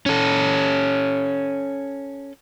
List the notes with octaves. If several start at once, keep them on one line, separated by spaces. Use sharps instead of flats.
C#4 A4